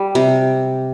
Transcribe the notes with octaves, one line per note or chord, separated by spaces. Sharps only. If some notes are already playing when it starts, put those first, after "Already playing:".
Already playing: G3
C3